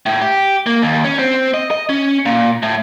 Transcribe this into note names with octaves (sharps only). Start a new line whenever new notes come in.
A2
G4
A#3
D#2
C#4
C4
D#5
D#5
C#4
A#2
A2